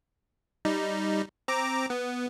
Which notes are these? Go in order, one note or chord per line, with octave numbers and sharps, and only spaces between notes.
G3 D#4
C4 A#5 D6
B3